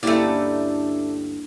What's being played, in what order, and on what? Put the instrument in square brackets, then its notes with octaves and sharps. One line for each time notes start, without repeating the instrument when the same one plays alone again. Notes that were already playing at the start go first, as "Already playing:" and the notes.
[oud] D2 G2 C#4 [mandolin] A3 D5 [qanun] A#3 E4 G4